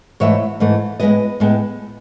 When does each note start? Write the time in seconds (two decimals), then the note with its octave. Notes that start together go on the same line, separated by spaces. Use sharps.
0.20 G#2 E3 A3 C#5 E5
0.60 G#2 E3 A3
1.00 A2 G#3 B3 B4 D#5
1.40 A2 G#3 B3